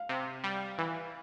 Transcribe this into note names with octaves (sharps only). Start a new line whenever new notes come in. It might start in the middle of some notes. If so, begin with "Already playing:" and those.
Already playing: F5
C3
G3
E3